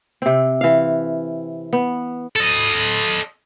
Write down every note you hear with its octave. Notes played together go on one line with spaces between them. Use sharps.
C3 C4
E3 F5
B3
A4 D#5